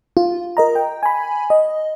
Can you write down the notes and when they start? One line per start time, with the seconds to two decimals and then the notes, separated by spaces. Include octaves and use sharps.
0.17 F4
0.57 A#4 D#5 A#5
0.75 G5
1.03 G#5 B5
1.50 D#5